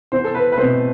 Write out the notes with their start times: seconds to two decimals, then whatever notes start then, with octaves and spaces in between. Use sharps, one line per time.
0.12 E2 C5
0.24 A4
0.35 B4
0.52 B4
0.57 B2 A3 C4 C5